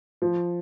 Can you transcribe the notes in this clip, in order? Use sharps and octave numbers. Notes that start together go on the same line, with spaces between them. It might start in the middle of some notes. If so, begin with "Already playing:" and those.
F3